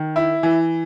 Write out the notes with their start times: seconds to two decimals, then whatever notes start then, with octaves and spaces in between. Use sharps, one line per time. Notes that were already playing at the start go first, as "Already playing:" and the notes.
Already playing: D#3
0.16 E4
0.43 E3